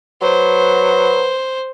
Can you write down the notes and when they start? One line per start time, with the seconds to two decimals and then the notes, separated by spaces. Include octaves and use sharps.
0.22 F#3 B4 C5